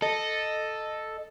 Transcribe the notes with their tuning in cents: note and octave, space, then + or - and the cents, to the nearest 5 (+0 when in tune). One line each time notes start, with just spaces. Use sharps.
A4 +0 D#5 -10